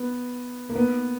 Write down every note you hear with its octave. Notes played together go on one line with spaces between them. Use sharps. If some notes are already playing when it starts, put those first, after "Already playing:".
Already playing: B3
A#3
B3